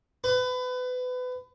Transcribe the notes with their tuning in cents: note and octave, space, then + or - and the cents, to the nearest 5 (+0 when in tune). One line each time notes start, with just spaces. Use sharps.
B4 +30